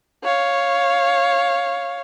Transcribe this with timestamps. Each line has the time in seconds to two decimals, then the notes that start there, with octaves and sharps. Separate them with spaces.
0.24 C#5 F5